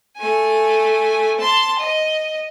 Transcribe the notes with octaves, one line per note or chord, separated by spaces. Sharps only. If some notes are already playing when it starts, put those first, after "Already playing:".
A3 G#5
A5 C6
D#5